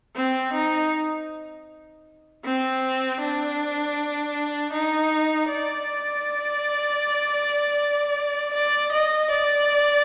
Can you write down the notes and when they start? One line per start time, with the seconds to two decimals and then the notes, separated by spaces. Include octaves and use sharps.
0.16 C4
0.53 D#4
2.44 C4
3.20 D4
4.73 D#4
5.49 D5
8.54 D5
8.92 D#5
9.30 D5